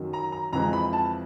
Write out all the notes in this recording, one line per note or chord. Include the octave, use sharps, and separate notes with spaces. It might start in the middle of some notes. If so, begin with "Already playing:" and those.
Already playing: F#2 D#3 F#3
A#5
A#5
F2 C3 E3 G#3 A#5
B5
A5